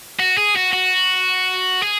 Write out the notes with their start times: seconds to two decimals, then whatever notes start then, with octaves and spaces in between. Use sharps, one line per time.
0.19 F#4
0.37 G#4
0.56 F#4
0.73 F#4
1.83 G#4